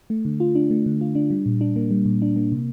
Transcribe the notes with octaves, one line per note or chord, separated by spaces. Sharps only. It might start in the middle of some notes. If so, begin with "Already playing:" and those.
A3
D3
F4
D4
A3
D3
F4
D4
G3
A#2
D4
A#3
G3
A#2
D4
A#3
C3